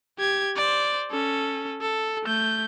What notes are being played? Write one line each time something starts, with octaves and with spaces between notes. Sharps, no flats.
G4 G#6
C5 D5
C#4 A4
A4
A3 G6